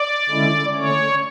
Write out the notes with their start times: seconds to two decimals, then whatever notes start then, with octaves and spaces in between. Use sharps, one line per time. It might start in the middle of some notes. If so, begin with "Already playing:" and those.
Already playing: D5
0.29 D3 G#3 C#4 E4
0.74 D3 A3 C#4 C#5